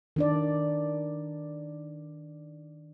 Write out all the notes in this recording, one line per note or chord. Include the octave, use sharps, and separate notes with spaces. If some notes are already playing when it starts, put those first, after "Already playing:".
D#3 D4 D5